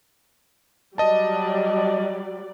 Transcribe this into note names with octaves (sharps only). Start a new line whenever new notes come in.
F#3 G3 D5 D#5 A5